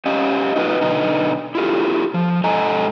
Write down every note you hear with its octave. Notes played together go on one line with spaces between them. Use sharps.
C#4 G4 D#5 F5
D#4 F4 F#4 B4 D#5
B2 D3 B3 D#4
E4 F4 G4 A4
F3
G#2 A4 D#5 G#5 A#5